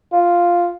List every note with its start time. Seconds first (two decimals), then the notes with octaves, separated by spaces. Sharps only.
0.12 F4